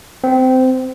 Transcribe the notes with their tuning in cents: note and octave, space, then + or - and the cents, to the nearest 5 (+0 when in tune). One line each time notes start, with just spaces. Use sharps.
C4 -20